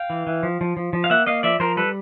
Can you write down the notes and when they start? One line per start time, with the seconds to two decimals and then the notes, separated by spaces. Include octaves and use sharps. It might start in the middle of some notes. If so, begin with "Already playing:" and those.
Already playing: F5 G5
0.10 E3
0.27 E3
0.43 F3
0.61 F3
0.77 F3
0.93 F3
1.04 F5
1.10 A#3 E5 F#5
1.27 A#3 D#5 F5
1.43 F3 D5 E5
1.60 F3 A#4 C5
1.77 G3 A4 B4